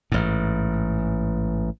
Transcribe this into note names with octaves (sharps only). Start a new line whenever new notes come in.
A1 G#2